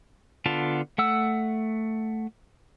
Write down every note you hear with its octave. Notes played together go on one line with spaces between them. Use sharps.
D3 B3 F4 A5
A3 F#5 E6